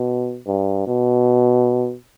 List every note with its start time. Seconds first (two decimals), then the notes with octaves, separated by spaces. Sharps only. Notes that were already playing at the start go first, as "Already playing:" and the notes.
Already playing: B2
0.47 G2
0.87 B2